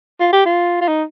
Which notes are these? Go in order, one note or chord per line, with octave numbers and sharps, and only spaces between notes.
F4
G4
F4
F4
D#4